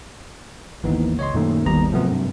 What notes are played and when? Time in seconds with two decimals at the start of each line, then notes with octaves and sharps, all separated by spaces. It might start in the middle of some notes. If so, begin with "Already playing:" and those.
0.84 G#1 D#2 E3 B3 D#4
1.19 C#2 C#5 D#5 C6
1.34 F#2 A#2 D#3 A3
1.65 G1 D#2 D#3 G3 B3 A#5
1.92 G#2 C3 F3 F#3 A3 B3
2.11 G2